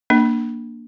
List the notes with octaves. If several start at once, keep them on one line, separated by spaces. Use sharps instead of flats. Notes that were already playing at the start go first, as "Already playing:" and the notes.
A#3 D4